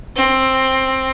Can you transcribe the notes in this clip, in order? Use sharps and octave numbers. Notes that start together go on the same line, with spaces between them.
C4